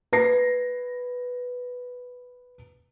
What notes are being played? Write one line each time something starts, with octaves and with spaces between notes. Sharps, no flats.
B4 A#6 C7